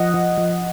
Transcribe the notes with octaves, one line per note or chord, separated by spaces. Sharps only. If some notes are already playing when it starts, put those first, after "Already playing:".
Already playing: F3 D#5 F#5
F3
F3